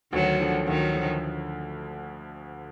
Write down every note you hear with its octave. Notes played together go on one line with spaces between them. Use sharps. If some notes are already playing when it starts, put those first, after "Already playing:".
D2 D#3 F#3
D3 F3
D2 D#3 F#3
D3 F3